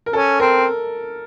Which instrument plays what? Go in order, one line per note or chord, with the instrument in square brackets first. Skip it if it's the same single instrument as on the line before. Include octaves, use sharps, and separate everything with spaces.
[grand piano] A#4
[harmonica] C#4 [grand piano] A4
[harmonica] C4 [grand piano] A#4